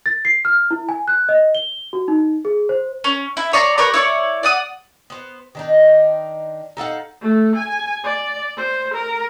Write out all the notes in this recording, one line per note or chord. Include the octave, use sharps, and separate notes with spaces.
A6
C7
F6
E4
G#5
F#6
D#5
G7
F#4
D#4
G#4
C5
C#4
E4
C#5 D5 A#5 C6
G4 A#4 B4 C#5
E4 C#5 D5
D5 F#5 D#6
B3 C5
D#3 D4 D#4
D#4 A4 F5 F#5
A3
G#5
D5
C5
A#4